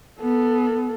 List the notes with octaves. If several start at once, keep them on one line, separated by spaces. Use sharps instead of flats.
B3 A4